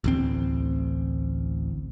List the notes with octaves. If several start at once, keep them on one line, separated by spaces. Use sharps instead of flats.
A1 D2 C4